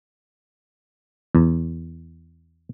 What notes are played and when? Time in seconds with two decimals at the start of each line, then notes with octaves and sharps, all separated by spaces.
1.35 E2